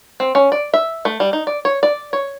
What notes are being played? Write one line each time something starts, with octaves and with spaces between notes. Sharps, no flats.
C4
C#4
D5
E5
A3
G3
D#4
D5
C#5
D5
C#5